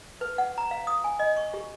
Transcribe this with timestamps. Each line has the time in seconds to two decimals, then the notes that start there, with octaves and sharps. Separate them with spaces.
0.21 B4
0.38 F#5
0.58 A#5
0.71 F5
0.87 D#6
1.04 G#5
1.19 D#5
1.37 C#6
1.54 G4